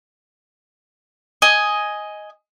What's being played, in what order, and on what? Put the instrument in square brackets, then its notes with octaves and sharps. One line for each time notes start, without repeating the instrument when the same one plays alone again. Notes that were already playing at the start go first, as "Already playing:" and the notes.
[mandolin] D#5 G#5